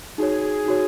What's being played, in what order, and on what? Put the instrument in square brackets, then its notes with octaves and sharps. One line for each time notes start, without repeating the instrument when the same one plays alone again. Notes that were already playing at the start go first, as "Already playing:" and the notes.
[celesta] D#4 F#4 C#5 [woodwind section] G#4
[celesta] D#4 F#4 C#5